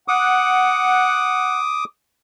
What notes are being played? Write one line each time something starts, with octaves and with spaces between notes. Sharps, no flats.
F#5 D6 D#6